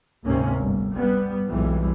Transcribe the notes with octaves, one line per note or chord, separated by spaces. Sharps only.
D2 G#2 C3 A#3 C4 C#4
G1
G3 B3
B1 F2 E3 G3 G#3